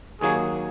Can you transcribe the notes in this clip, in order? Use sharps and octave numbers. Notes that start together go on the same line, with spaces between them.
D#2 D#3 F#3 A#3 F#4 G#4